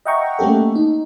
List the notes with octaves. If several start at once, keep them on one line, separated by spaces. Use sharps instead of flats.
D#5 E5 F#5 G5 A#5 C#6
A3 A#3 C#4 G4 A4
D#4